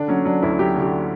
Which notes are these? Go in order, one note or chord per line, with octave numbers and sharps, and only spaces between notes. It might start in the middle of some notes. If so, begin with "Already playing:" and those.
Already playing: D3 D4
F#3 C#4
F#3 D4
D2 E4
F#3 G4
D3
G4